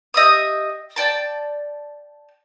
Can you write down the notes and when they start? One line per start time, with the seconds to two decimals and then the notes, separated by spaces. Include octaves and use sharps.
0.14 G4 D#5 E5 D#6
0.96 D5 G5 A5